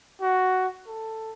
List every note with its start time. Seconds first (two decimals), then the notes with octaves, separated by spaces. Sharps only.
0.21 F#4
0.87 A4